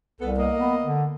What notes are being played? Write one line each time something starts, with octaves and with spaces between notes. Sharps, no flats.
C2 B3 A4
A#3 D#5
B3
D3